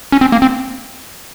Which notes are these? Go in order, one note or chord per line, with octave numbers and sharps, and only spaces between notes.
C#4
C4
A#3
C4